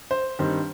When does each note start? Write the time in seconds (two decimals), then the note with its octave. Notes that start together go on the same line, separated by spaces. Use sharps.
0.11 C5
0.39 G2 D#3 G3 C4